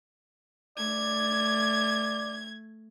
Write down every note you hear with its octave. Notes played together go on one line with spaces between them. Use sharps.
A3 D5 G#6